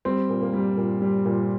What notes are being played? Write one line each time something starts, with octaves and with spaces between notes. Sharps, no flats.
G3 C4
A#2
A#3
G3
A#2
G3
A#2